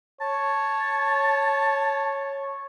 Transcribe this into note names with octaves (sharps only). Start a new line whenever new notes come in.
C#5 A5